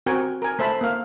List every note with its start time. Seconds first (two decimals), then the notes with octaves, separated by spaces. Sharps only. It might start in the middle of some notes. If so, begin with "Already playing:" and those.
0.06 C4 F#4 A#4 G5 G#5
0.42 A#4 G#5
0.59 A3 C5 E5 A5 B5
0.81 A#3 F5